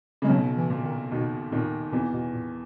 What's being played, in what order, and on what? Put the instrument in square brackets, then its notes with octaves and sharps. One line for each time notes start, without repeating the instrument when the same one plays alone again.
[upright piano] C#3 [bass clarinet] G#3
[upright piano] B1 B2 [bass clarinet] F#3
[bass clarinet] E3
[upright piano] A#2
[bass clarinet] D#3
[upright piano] D#2 D#3 [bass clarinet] B2
[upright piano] D#2 D#3 [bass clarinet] A#2
[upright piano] E2 E3 [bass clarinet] B2
[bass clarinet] B2
A#2